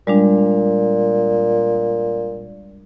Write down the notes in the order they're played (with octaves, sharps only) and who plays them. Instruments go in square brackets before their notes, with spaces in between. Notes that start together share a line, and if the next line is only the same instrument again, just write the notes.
[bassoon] A#2 [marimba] G3 G#3 D4